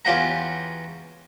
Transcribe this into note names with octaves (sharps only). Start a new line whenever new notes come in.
E2 C#4 F4 G4 F#5 A#5